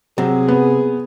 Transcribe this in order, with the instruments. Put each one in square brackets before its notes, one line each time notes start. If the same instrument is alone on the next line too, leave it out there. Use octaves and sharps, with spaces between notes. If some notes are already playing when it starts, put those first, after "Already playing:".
[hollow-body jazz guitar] C3 [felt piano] F#3 [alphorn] G#4
[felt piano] B3